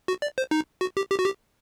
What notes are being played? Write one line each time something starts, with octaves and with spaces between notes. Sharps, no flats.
F#4
D5
C5
D#4
F#4
G4
G4
F#4
G4